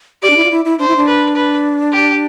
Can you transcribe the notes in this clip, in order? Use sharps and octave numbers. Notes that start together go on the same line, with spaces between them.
G4 D5
D4
E4
F4
E4
E4
D4 C5
E4
D4
B4
B4
G4